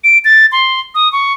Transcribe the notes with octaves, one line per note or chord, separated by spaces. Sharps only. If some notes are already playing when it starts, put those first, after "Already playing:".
D7
A6
C6
D#6
C#6